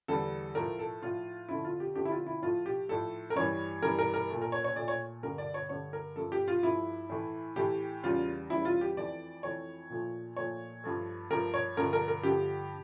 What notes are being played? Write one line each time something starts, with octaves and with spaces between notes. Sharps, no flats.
E2 D3 G3 A4
A2 F3 A3 A#4
A4
A2 F3 A3 F4
F2 D3 A3 E4
F4
G4
F2 D3 A3 G4
E4
F4
E4
A2 F3 A3 F4
G4
A2 F3 A3 A4
A#4
G2 E3 G3 C#5
G2 E3 G3 A#4
A#4
A#4
A#2 A3
A#4
C#5
C#5
A#2 A3 D5
C#5
G2 D3 A3 A#4
D5
C#5
G2 D3 A3 C#5
A#4
G2 F3 A3 A4
G4
F4
G2 F3 A3 E4
A2 E3 A3
A2 E3 A3 G4
E2 C#3 G3 F4
E2 C#3 G3 E4
F4
G4
F2 E3 A3 D5
F2 E3 A3 C#5
A#2 F3 A3
A#2 F3 A3 C#5
G2 F3 A3
G2 F3 A3 A#4
C#5
G2 D3 F3 A3 A#4
A#4
A#4
G2 D3 F3 A3 G4